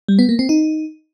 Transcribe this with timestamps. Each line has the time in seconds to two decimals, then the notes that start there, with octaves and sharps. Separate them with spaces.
0.08 G3
0.19 B3
0.29 A#3
0.39 C4
0.49 D#4